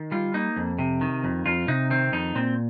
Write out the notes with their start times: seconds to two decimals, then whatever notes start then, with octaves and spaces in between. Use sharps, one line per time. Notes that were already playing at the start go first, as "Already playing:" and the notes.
Already playing: D#3
0.11 G3 F4
0.34 A#3 D#4
0.56 F2
0.79 C3
1.01 D#3
1.24 F2
1.46 F2 F4
1.68 C3 D#4
1.90 D#3 C4
2.13 F2 D#4
2.35 A#2 C4